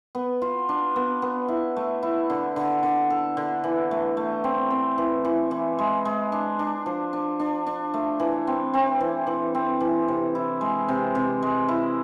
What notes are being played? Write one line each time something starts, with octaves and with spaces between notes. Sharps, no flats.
B3
F4
D4
B3
B3
E4
A3
E4
D3
D3
D3
A4
D3
E3
A3
A3
C4
C4
E3
E3
E3
G#3
G#3
D4
D4
F3
D4
D4
D4
A3
E3
C4
C4
E3
E3
C4
E3
C3
E4
G#3
C3
C3
G#3
E4